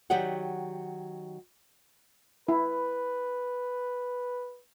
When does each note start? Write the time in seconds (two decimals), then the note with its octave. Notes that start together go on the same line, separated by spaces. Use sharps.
0.10 D#3 F#3 G4 D5 D#5 F#5
2.48 E4 B4